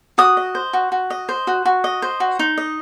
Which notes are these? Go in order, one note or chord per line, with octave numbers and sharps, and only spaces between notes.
F#4 D#6
D#5
C5
F#4
F#4
D#5
C5
F#4
F#4
D#5
C5
F#4
D#4
D#5